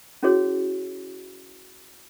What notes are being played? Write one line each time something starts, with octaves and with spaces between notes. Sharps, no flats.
C#4 E4 F#4 G#4 C#5